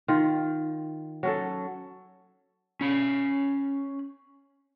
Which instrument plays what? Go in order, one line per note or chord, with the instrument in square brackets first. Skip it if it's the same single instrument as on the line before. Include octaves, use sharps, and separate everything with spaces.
[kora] D#3 F4
F#3 C#4 A4
[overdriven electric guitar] C#4 B5